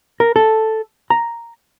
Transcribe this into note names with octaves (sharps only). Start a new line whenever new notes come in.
A#4
A4
A#5